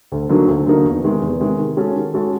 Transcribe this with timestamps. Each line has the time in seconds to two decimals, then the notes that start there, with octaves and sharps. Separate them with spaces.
0.12 D2
0.29 D3 F#3 A#3 D#4
0.48 D2
0.66 D3 F#3 A#3 D#4
0.84 E2
1.03 C3 D#3 G#3
1.22 E2
1.40 C3 D#3 G#3
1.58 D#3
1.77 G#3 C#4 F#4 A4
1.95 D#3
2.14 G#3 C#4 F#4 A4